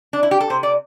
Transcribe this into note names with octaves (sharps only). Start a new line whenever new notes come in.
D4
E4
G4
A4
C3 C5
D5